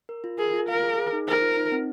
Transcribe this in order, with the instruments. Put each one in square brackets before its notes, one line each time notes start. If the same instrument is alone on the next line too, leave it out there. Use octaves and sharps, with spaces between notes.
[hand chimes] A#4
F4
[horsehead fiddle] G#4 [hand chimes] A#4
[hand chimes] F4
[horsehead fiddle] A#4 [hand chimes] F5
[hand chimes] G#4
G#4
D#4
[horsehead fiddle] A#4 [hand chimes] C5
[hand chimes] F4
D#4
C4